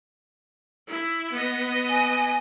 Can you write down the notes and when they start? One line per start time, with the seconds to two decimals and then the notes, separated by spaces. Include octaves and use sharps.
0.88 E4
1.32 B3 D#5
1.90 G#5